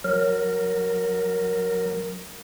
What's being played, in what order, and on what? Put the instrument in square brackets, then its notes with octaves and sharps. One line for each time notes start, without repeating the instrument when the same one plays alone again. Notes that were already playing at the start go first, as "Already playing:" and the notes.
[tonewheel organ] F#3 A#4